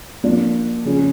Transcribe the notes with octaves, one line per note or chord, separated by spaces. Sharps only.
F3 A#3 D4 F4
C#3 F3 C#4